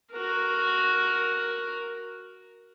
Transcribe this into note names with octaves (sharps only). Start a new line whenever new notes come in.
F#4 A#4